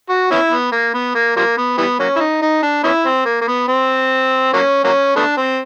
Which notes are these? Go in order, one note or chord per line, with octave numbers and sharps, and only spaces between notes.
F#4
B3 C#4 E4
B3
A#3
B3
A#3
F3 G3 A#3
B3
E3 G3 B3
F#3 A#3 C#4
E4
D#4
D#4
D4
B3 C#4 E4
C4
A#3
A#3
B3
C4
F#3 A#3 C#4
F#3 A#3 C#4
A3 B3 D4
C4